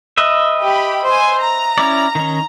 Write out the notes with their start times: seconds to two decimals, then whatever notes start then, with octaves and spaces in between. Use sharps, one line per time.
0.17 B4 D#5 E5
0.62 G4 B5
1.08 C5 G#5
1.42 A#5
1.78 C#4 E4 D5
2.15 D#3 C#4